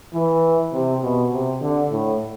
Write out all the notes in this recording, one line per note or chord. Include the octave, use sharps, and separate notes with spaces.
E3
C3
B2
C3
D3
A2